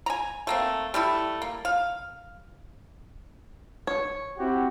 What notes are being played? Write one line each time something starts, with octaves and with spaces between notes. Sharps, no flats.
G#5 A#5
A3 A#3 C4
G3 A3 E4
A#3
F5
C#5
C4 E4 F#4 G4